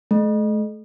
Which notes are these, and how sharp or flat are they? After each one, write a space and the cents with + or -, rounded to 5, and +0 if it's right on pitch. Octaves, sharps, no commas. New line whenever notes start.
A3 -45